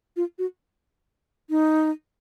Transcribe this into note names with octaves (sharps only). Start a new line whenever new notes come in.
F4
F#4
D#4